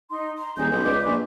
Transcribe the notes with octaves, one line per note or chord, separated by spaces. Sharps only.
D#4 C6
A#5 C6
D#1 D#4 G#4 D#5 G6
B1 C#4
C#2 B4 D5 D6
A#1